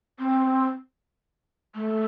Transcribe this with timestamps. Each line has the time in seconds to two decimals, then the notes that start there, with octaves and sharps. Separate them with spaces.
0.19 C4
1.75 A3